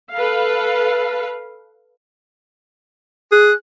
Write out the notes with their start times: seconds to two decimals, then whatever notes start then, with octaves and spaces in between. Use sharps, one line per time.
0.13 A4 B4 F5
3.32 G#4 F#6